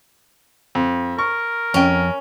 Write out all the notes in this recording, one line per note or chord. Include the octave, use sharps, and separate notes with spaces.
F2
A#4 C#6
F2 C#4 G5